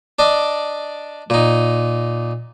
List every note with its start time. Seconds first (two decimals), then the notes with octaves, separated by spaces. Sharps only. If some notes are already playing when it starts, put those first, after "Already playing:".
0.19 D4 D5 D#5
1.30 A#2 D#4